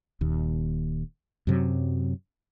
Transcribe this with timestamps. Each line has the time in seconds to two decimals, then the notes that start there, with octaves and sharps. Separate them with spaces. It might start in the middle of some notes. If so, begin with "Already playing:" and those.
0.21 D#1 D#2
1.47 F#2 C3 F#3